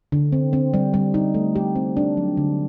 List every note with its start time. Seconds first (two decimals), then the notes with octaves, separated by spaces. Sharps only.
0.12 D3
0.32 C4
0.53 C4
0.74 G3
0.94 G3
1.14 D#4
1.34 A3
1.55 G4
1.75 C4
1.97 D4
2.17 F#3
2.37 D3